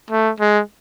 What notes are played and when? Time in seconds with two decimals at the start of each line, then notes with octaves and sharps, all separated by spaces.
0.10 A3
0.40 G#3